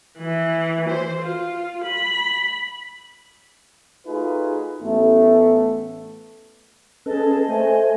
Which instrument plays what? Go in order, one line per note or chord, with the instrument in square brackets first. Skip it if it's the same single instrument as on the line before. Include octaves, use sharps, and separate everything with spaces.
[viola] E3
C5
F4
B5
[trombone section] A3 D#4 F4 F#4 G#4 B4
A1 A3 B3
[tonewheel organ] C#4 A4 B4 [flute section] G#4 A5 [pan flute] D#5
[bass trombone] A3 [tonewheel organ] C5 [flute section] G#5